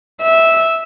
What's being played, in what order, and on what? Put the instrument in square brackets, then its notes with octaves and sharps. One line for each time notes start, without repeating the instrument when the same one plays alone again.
[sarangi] E5